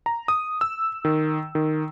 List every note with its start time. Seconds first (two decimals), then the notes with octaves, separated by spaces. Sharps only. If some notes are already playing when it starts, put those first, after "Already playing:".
0.06 A#5
0.28 D#6
0.61 E6
1.05 D#3
1.55 D#3